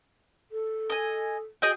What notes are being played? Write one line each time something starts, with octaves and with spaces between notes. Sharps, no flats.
A4
D#5 G#5
F#4 G#4 D#5 G5